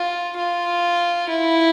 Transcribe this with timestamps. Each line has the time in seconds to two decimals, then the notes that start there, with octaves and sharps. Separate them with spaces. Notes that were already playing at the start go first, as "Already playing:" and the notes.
Already playing: F4
0.37 F4
1.29 E4